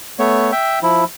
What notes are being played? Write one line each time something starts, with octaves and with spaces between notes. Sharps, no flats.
A3 B3 C#5
E5 G5
F3 E4